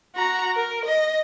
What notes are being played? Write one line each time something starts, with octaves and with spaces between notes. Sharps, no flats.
F#4 A#5
A#4
D#5